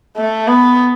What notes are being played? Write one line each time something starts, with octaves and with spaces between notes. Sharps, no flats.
A3
B3